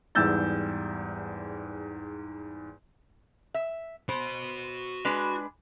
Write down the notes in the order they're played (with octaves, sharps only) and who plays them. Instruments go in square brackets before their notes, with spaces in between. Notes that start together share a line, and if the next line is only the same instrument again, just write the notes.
[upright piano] E2 G#2 G3 E6 G6 A6
[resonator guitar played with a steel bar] E5
[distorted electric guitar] F#4 B5 [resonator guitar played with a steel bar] C5
[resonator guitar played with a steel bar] G#3 D4 B4